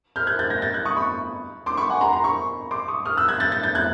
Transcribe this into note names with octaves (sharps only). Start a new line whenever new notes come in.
F6 G6
F#6 G#6
G6 A6
G#6 A#6
G6 A6
F#6 G#6
C#6 D#6
B5 C#6
C6 D6
B5 C#6
F#5 G#5
A#5 C6
A#5 C6
B5 C#6
C6 D6
C#6 D#6
D#6 F6
E6 F#6
F#6 G#6
G6 A6
G6 A6
G6 A6
F#6 G#6